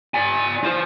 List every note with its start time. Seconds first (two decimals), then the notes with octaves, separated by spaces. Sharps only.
0.14 D5 G#5
0.64 F4 C5